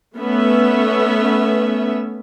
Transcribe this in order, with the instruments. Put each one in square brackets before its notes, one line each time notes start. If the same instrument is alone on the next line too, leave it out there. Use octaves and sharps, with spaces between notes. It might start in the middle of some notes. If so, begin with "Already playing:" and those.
[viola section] A3 B3 C#4 E5